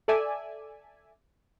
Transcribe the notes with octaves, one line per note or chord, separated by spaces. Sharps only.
A4 D5 E5 G#5